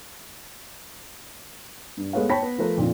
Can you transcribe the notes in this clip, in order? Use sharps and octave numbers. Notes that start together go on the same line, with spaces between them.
G2
G#3 A3 B3 C#5 F5
C#5 G5 A5 B5 A#6 B6
B3
F3 A3 A#4 B4
F2 A#2 D3 F3